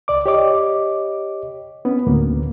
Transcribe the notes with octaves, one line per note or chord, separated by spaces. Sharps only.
C#2 D5 D6
G4 C#5 D#5 D6
B3 C#4
D2 A2 A#3